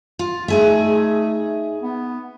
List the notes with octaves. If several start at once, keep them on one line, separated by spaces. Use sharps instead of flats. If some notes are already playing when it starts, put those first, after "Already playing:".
F4
A3 D#4 G#4 E5
B3